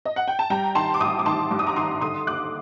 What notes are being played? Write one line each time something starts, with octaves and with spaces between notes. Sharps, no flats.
D#5
F#5
G5
A5
G3 G5 A#5
D#3 A5 C6
D6
A1 C6 D#6
D6
D#3 A5 C6
G2 D6
D#6
A#5 D6
D#3 C6 D#6
D3 C6 D#6
D#2 D6 F#6